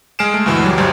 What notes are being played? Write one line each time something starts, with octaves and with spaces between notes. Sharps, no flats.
G#3 G#4 F6 C7 D7 E7
A3
D2 G2 B2 E3
F#3 G3
G1 F#3 G3 C5